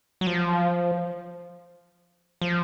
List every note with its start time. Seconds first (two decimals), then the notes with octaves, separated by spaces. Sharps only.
0.21 F#3
0.27 F3
2.41 F3